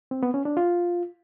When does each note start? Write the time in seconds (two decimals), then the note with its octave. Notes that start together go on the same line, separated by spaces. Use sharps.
0.11 C4
0.23 B3
0.34 C#4
0.45 D4
0.57 F4